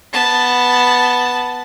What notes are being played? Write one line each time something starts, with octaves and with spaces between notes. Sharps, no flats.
B3 A5